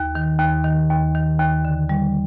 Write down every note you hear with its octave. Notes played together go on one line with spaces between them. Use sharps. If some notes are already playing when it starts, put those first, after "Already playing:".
Already playing: D#2
D#3
D#2
D#3
D#2
D#3
D#2
D3
G3